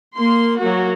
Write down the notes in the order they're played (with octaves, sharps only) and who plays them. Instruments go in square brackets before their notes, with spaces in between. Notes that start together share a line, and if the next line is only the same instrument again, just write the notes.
[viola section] A#3 C6
F#3 A#3 F#4